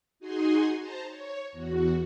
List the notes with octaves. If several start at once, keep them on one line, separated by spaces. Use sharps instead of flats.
D#4 F#4 G#4 G#5 C6
C5 A5 A#5
C#5
E2 F#4